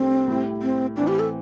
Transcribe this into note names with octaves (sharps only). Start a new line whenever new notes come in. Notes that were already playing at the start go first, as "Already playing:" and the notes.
Already playing: C2 C3 A3 C4 D4 G4
A2 G3 E4 G4
C4
A2 E3 C4 D4
G4
A4